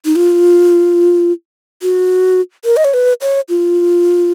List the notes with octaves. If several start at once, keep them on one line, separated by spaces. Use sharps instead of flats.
D#4
F4
F#4
A#4
D#5
C#5
B4
C#5
F4